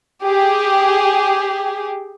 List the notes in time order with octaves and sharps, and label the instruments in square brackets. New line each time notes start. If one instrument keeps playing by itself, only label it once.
[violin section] G4 G#4